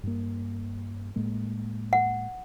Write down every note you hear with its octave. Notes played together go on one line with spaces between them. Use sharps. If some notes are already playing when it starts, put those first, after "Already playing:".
G2 A#3
A2 G#3 A#3
F#5